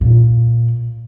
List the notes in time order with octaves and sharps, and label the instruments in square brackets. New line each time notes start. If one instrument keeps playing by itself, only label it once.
[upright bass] A#2